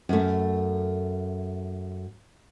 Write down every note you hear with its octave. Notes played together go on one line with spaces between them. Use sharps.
F#2 A3